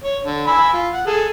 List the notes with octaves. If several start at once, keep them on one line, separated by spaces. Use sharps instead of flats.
C#5
D3
G#5 B5 E6
F4
F#5
G#4 A4